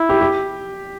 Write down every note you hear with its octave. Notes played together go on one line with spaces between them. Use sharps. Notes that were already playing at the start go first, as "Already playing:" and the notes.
Already playing: E4
G4
G4